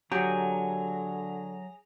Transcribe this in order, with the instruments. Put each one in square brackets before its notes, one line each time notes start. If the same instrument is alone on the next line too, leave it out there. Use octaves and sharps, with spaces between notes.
[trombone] D3 [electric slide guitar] F#3 [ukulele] G4 [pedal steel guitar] G#4 A#5